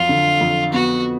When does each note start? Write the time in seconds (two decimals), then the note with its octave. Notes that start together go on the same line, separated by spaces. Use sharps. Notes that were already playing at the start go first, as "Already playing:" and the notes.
Already playing: F2 F#3 F4
0.09 D3
0.41 F2
0.73 B3 F#4